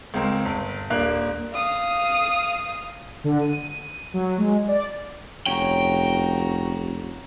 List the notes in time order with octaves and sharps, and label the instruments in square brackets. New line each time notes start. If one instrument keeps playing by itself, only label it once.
[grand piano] C#2 G#3 C4 A#4
G1
D#1 A#3 D4 F#6
[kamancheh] F5 D#6
[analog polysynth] D3
D#7
F#3
G#3
D5
[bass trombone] F1 [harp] C#4 [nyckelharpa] F#4 A#5 [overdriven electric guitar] G5